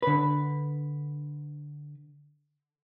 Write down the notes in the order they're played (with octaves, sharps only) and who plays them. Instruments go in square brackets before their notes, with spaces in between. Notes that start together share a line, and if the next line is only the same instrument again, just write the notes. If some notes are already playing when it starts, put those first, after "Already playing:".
[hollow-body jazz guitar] D3 B4